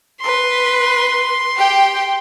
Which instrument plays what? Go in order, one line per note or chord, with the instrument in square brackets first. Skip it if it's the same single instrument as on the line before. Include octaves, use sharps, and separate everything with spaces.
[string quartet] B4 [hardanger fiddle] C6
[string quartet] G4 G5